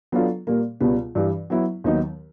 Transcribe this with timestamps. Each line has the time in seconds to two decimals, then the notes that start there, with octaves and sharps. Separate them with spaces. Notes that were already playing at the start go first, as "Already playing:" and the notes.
0.12 F#3 B3 D4 F4 A4
0.47 A#2 G3 A#3
0.80 C#2 B2 G3 B3
1.15 G2 E3 G3
1.50 F#3 B3 E4
1.84 D#2 D#3 F#3 B3 D#4